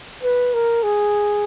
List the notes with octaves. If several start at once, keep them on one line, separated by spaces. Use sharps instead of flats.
B4
A#4
G#4